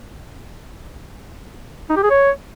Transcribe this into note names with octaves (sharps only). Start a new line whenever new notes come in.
D#4
G4
G#4
C#5